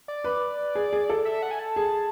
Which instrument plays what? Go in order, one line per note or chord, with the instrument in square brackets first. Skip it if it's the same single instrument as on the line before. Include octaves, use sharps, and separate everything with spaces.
[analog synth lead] D5
[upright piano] B4
G#4
G#4
A4
[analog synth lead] E5
F#5
G#5
A5
[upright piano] G#4